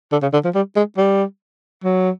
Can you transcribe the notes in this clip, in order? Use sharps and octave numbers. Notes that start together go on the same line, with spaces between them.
D3
C#3
D3
F3
G3
G#3
G3
F#3